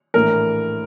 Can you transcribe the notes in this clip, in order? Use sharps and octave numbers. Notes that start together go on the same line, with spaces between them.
A#1 A2 E3 A#4